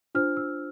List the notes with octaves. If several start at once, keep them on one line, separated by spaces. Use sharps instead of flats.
D4 F4 C5 F6
E6